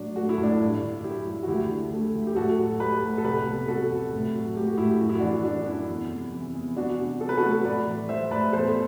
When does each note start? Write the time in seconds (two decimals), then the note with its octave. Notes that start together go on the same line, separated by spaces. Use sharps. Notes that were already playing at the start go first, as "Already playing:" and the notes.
Already playing: A2 F#3 D4
0.16 A3 F#4
0.29 E4
0.38 A2
0.43 D4
0.57 G2 E4
0.81 D3
1.04 F#3 E4 G4
1.26 G2
1.43 F#4
1.47 D2 E4 G4
1.70 D3
1.92 A3
2.15 D2
2.27 G4
2.36 A2 F#4 A4
2.58 F#3
2.80 A3 G4 B4
3.02 A2
3.18 A4
3.24 C2 G4 B4
3.46 B2
3.68 G3 F#4 A4
3.91 C2
4.13 A2
4.34 F#3
4.57 A3 G4
4.67 F#4
4.77 A2 E4 G4
5.00 F#2 F#4
5.09 E4
5.19 E3 D4 F#4
5.45 A3 D4
5.66 F#2 E4
5.88 E2
6.11 C3
6.32 E3
6.55 E2
6.76 E2 D4 F#4
6.99 C3
7.21 F#3 A4
7.29 B4
7.37 F#4 A4
7.42 A3
7.65 A2 B4 D5
7.87 E3
8.09 G3 C5 E5
8.30 A2 B4 D5
8.53 E2 A4 C5